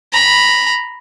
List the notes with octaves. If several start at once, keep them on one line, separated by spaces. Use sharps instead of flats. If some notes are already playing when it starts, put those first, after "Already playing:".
A#5 B5